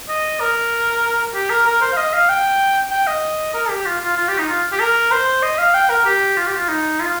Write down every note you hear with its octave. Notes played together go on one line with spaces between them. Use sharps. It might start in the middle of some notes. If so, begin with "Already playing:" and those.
D#5
A#4
G4
A#4
A#4
C5
F5
D#5
F5
G5
G5
D#5
A#4
G4
F4
F4
F4
G4
D#4
F4
G4
A#4
C5
D#5
F5
G5
A#4
G4
F4
G4
F4
D#4
F4